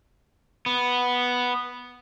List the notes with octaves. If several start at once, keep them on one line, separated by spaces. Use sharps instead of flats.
B3